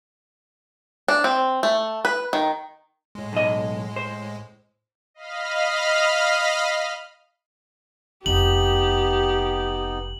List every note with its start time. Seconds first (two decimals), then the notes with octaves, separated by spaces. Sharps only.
1.08 D4
1.24 C4
1.63 A3
2.05 B4
2.33 D#3
3.15 A2 G#3
3.33 B1 D#5
3.96 C5
5.14 D#5 F5 B5 F6
8.26 F1 B3 D#4 G4 F#7